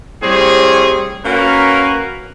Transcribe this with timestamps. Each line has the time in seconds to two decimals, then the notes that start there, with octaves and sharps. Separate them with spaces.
0.22 A2 G3 C4 G#4 C#5
1.25 A#3 C#4 F#4 A#4 B4